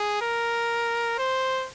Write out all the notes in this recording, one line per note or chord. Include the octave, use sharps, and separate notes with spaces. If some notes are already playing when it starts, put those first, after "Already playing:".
Already playing: G#4
A#4
C5